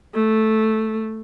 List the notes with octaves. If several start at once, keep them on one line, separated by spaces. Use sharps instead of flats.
A3